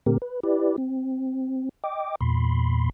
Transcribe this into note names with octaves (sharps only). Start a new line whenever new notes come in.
A#2 D3 A3 C4 G4 A#4
B4
E4 G4 B4 D5
C4
D#5 G5 D6
E2 A#2 B5 C6